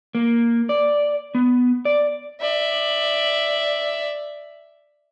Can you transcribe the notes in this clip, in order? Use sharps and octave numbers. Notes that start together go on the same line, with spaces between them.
A#3
D5
B3
D5
D5 E5